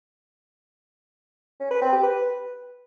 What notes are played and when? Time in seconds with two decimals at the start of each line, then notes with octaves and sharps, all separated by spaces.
1.60 C#4
1.71 B4
1.82 C4
1.92 G4
2.03 B4